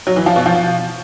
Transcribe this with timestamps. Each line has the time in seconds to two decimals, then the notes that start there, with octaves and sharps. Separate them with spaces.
0.07 F#3
0.17 E3
0.26 F3
0.36 B2
0.46 F3